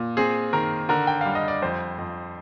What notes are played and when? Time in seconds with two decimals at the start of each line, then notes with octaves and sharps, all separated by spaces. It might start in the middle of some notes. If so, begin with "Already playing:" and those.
Already playing: A#2
0.17 C4 G#4
0.53 D#3 A#4
0.89 D3 A#4
1.07 G5
1.21 G3 F5
1.35 D#5
1.48 D5
1.62 F2 C5
1.98 F2